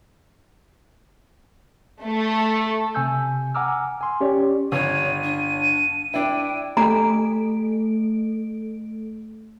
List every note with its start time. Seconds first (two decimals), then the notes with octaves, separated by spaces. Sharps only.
2.03 A3
2.95 C3 G#5 E6 G6
3.55 F#5 G#5 A#5 D6 E6 F6
4.01 G#5 C6
4.21 C#4 G4 C#5 D5
4.72 G1 C#5 D#7
5.23 D4
6.14 D4 E4 G5
6.77 A3 A4 A#5 D7